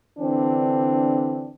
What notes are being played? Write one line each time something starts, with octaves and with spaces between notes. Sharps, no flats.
D3 E3 C4 D4